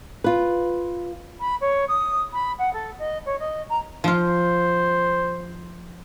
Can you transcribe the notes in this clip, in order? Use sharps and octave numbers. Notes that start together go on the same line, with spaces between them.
F4 B4
B5
C#5
D#6
B5
F#5
A4
D#5
C#5
D#5
A#5
F3 F4 C5